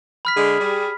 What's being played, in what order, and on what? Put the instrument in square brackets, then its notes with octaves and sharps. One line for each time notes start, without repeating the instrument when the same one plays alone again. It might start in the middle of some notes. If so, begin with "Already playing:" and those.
[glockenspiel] B5 F6 B6
[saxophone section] D3 G#3 [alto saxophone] G#4
[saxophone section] G3